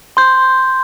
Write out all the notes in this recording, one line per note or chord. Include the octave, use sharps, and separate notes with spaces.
C6 G6